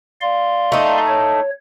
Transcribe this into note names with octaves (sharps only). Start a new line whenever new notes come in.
D5 F5 C6
A3 D#4
C#5